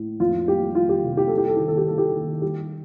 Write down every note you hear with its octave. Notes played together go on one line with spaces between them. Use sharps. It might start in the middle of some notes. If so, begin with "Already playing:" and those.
Already playing: A2
F2 F4
G3 G4
G3 F4
G4
C3
G4
G3 A4
G4
A4
D#3 G4
A4
G4
G3 A4
G4
D#3
G3 G4